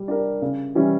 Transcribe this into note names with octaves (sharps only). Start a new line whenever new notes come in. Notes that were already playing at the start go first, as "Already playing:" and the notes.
Already playing: G3
D4 G4 A#4
C#3
E3 G3 C#4 E4